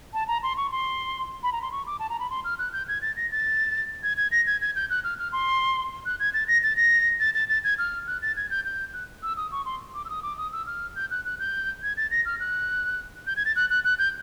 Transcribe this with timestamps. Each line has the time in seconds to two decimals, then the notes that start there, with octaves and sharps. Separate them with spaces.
0.14 A5
0.28 A#5
0.43 C6
0.57 C#6
0.71 C6
1.43 B5
1.52 A#5
1.62 C6
1.72 C#6
1.87 D6
1.99 A5
2.10 A#5
2.20 B5
2.30 C6
2.45 F6
2.59 F#6
2.73 G6
2.88 G#6
3.02 A6
3.17 A#6
3.32 A6
4.03 G#6
4.17 G#6
4.31 A#6
4.47 G#6
4.61 G#6
4.76 G6
4.90 F#6
5.04 F6
5.19 F6
5.32 C6
6.06 F#6
6.20 G#6
6.34 A6
6.48 A#6
6.63 A6
6.77 A#6
7.20 A6
7.34 A6
7.49 A6
7.64 G#6
7.78 F6
8.07 F#6
8.22 A6
8.37 G#6
8.50 G6
8.65 G6
8.93 F#6
9.23 E6
9.37 D#6
9.52 C#6
9.65 C6
9.94 D6
10.05 E6
10.10 D#6
10.23 D6
10.38 D#6
10.52 E6
10.67 F6
10.96 G6
11.11 F#6
11.25 F#6
11.39 G6
11.83 G#6
11.97 A6
12.11 A#6
12.25 F6
12.40 F#6
13.27 G6
13.37 G#6
13.45 A6
13.56 F#6
13.70 F#6
13.84 F#6
13.99 G6